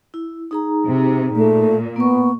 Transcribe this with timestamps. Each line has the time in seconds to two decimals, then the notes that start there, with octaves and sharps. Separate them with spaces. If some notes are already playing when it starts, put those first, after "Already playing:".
0.14 E4
0.51 D#4 G#4 A#5
0.86 C3
1.36 A#2 A3
1.96 A#3 B3 C#6